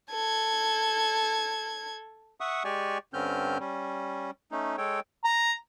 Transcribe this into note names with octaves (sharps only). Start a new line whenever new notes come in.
A4 G#6
E5 F#5 C#6 D#6
G#3 G4 D5 G#5 C#6
G2 D3 C4 C#4 F6 G6
G3 C#4
A3 C#4 D#4
G#3 A4 C#5 G5
A#5